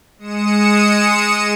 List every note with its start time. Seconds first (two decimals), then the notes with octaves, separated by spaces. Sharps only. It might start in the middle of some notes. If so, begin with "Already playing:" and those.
0.18 G#3 D#6 C#7 E7